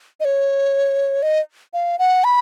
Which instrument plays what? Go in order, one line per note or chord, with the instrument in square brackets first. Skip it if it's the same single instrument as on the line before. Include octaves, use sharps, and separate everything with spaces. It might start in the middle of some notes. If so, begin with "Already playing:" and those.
[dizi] D#5
C#5
D#5
F5
F#5
B5